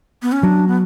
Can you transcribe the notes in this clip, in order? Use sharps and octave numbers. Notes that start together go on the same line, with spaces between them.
B3
C#4
F#3 D4
B3